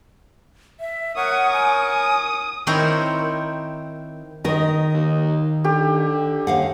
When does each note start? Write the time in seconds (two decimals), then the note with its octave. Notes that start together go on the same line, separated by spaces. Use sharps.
0.80 E5
1.16 A#4 C#5 F#5 C#6 D#6
1.53 G#5
1.91 D#6
2.67 D#3 C4 E4 A#4 C5 C#5
4.44 D#3 A#4 D#5 A#5
4.93 D#2
5.64 D3 G4
6.47 D#2 F5 F#5